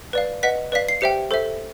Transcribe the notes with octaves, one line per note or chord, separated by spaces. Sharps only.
B4 D5 F5
B4 D#5 F#5 B6
B4 D5 F5 B6
C7
G4 C5 E5 G5 C#7
A4 C5 E5